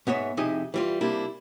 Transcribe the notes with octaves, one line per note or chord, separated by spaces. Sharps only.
G#2 B3 C#5 E5
F2 C3 D#4 E4 G#4 D#5
E3 G3 F4
C3 G3 A#3 D4 E4